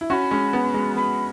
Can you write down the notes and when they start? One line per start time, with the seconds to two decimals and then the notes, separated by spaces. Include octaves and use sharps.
0.01 E4
0.10 C#4 F#4 B5 C#6
0.31 G#3 C#4
0.53 B3
0.74 G#3
0.96 B3 B5